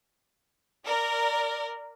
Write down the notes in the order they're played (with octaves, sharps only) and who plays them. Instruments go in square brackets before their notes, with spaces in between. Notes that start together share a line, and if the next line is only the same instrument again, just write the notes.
[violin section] A#4 D5